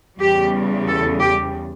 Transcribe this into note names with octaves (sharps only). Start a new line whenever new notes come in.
E2 C#3 G3 G4
A4
G4